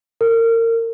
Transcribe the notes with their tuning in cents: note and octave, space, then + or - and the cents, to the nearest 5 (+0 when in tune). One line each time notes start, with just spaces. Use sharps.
A#4 -30